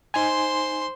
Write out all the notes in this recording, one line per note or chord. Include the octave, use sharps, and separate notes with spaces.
D#4 C5 G#5 C6